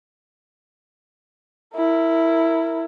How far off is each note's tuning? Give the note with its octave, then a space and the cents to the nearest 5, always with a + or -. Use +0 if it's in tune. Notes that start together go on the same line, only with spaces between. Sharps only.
E4 +0 A#4 -30